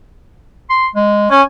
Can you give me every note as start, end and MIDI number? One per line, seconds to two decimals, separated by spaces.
0.70 0.86 84
0.95 1.26 56
1.31 1.42 61
1.31 1.41 80